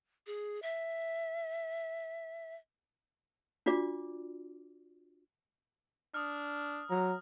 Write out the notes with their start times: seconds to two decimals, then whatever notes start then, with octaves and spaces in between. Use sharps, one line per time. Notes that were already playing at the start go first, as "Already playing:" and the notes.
0.27 G#4
0.62 E5
3.66 D4 F4 F#4 D5 D6
6.14 D4 D#6 F6
6.90 F#3 A#5